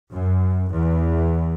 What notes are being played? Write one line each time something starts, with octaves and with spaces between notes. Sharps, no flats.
F#2
E2